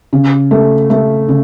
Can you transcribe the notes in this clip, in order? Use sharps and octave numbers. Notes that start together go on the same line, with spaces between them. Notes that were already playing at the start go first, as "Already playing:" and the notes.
C#3
A3
A3
C#3